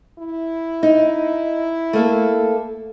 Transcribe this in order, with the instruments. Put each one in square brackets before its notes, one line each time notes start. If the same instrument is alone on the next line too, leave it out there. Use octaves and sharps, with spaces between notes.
[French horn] E4
[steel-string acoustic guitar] D#4
A3 A#3 A4